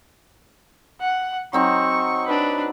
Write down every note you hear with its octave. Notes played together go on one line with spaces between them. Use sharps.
F#5
F#3 C4 D#4 C#6
D4 B4